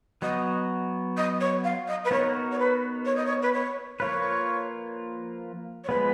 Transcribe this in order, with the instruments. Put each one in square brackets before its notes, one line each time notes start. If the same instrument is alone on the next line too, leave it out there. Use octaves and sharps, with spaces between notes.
[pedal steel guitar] F#3 B3 F#4 [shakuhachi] D#5
[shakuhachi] D#5
C#5
F5
D#5
B4
[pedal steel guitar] B3 D#4 F#4 A#4 [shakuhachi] C#5
[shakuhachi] C#5
B4
C#5
D#5
C#5
B4
C#5
[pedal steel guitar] F3 A#3 F4 B4 [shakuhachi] C#5
[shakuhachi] C#5
[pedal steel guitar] F3 G#3 B3 [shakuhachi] B4